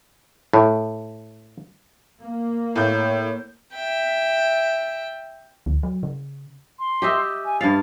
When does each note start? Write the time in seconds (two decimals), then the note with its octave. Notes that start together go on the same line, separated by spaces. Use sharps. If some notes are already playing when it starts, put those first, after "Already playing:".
0.53 A2
2.20 A#3
2.76 A2 C#5 G6
3.73 E5 G5
5.66 D2
5.83 F#3
6.03 C#3
6.79 C6
7.02 G4 D#5 E5
7.44 G#5
7.61 G2 F5 A6